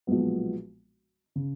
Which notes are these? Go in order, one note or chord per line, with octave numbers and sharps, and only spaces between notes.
B1 A#2 F3 G#3 B3
C#3